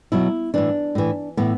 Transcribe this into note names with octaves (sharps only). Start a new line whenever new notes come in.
B2 F#3 E4
A2 E3 D4
A2 E3
A2 E3 B3